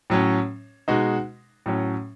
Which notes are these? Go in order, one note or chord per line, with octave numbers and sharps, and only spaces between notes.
A2 F#3 C#4
B2 G#3 D#4 F#4
A2 F#3 C#4